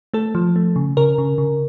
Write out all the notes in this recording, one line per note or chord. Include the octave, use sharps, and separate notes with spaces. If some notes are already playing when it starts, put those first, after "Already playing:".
A3 A4
F3
A3
C#3
C#3 A#4
C#3
C#3